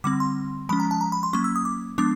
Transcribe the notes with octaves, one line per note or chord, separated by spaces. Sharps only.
D3 G3 C4 D6
C6
F3 G#3 C#4 B5
A#5
A5
A#5
B5
C6
F#3 A#3 C#4 C#6
E6
D#6
D6
F3 G#3 B3 D4 D6